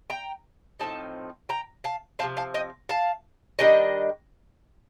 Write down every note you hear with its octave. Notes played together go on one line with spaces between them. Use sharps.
G5 A#5
A2 F3 C4 D#4 A5
G5 A#5
F5 A5
C3 F3 C4 F5 A5
F5 A5
D#5 G5
F5 A5
D#3 G3 D4 D#5 G5